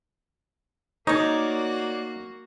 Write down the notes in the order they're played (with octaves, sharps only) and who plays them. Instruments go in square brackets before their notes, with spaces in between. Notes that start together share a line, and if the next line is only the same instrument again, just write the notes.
[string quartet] A#3 F#4 [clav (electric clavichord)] D#4 [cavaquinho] C#5 D5